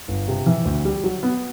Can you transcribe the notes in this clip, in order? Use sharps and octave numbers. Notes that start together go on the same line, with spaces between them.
G1
C3
E3
D2
G3
F#3
B3